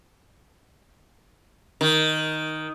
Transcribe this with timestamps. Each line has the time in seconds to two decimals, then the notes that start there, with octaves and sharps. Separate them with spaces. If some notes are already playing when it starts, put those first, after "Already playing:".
1.81 D#3